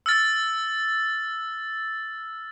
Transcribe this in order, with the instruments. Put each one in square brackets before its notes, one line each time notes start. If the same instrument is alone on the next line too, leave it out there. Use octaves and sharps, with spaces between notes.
[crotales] E6 F6 A6